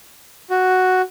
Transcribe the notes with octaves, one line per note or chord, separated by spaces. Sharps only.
F#4